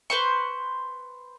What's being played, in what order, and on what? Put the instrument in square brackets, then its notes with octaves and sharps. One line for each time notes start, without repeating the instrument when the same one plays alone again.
[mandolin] B4 C5 C#6